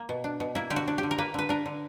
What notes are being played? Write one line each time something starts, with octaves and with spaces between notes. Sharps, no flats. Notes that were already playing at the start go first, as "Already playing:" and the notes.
Already playing: A#3
B2
D4
B2
A#3 E4
D3 G4
F#4
D4
G4
D3
A#4
A#3 B4
D3 B4
D4 A#4
D3